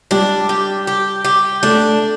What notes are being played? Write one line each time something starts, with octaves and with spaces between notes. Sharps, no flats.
G3 D4
G4
G4
G4
A3 D4